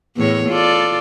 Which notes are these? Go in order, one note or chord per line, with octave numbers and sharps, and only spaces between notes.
E2 A2 C#5
F4 A4 D5